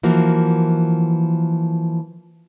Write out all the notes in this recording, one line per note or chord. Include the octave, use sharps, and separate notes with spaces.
E3 F3 A#3 F#4